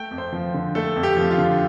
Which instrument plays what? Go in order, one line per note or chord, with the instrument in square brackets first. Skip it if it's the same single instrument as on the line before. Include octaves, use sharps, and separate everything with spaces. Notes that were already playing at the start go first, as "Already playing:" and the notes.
Already playing: [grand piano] A3 G5
F2
C5
F3
D3
A3 A4
F2
G4
F3
F4
D3